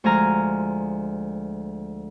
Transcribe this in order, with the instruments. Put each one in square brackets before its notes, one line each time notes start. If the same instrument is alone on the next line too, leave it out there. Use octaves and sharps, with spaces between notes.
[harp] D2 F3 G#3 G#5 A#5 F6